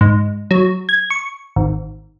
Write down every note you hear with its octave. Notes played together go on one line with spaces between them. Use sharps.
G#2
F#3
G#6
C#6
G#1